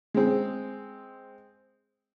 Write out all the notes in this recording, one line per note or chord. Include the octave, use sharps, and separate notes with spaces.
G#3 C4